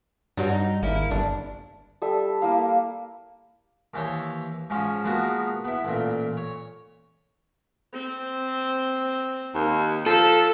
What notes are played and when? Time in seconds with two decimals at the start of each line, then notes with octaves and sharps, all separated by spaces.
0.37 G2 F#3 G3 F#4
0.51 D#4
0.82 G#1 A#3 E4
1.11 G1 D4
2.02 G3 A4 E5
2.42 A#3 E4 F5
3.94 D#2 E3 C5 C#5
4.70 G#2 F3 C#4
5.04 F3 G#3 A#3 B3 F#4
5.64 B3 E4
5.84 A1 A#2
6.37 C#5
7.93 C4
9.55 D#2
10.06 F3 A4